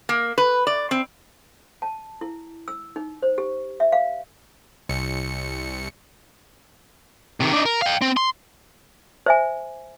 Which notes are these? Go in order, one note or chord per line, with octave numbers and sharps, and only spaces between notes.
A#3
B4
D5
C4
A5
E4
E6
D#4
C5
G4
E5
F5
C2 C#7
C3 D#3
D4 D#4
A#4
F5 G5
C4
C6
C5 E5 G#5